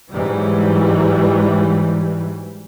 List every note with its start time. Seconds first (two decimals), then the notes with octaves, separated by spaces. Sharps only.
0.12 G#2 E3 F#3 G3